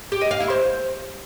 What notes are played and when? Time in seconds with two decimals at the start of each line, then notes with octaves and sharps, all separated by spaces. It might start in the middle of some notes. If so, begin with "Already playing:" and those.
0.12 G4
0.21 D#5
0.31 F5
0.40 E4
0.50 C5